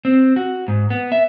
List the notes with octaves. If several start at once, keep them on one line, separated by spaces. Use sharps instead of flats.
C4
F#4
G#2
B3
E5